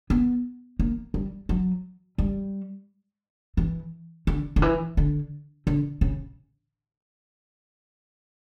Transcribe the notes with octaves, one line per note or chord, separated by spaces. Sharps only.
B3
A#3
G3
F#3
G3
E3
D3
D3
E3
D3
D3
C#3